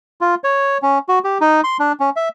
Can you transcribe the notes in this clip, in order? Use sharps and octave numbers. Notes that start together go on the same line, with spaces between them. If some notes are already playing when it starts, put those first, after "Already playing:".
F4
C#5
C#4
F#4
G4
D#4
C6
D4
C#4
E5